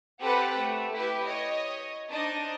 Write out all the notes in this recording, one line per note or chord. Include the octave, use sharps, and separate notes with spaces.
C4 G4 A4 B4 F#5 B5
A3
E4 G4 B4
C#5 D#5
D4 D#4 C5 D#5